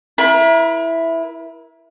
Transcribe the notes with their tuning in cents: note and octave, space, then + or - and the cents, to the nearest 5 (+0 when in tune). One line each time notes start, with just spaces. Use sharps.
E4 +0 A#4 +40